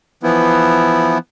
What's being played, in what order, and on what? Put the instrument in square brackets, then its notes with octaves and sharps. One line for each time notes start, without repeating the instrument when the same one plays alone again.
[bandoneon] E3 F3 B3 E4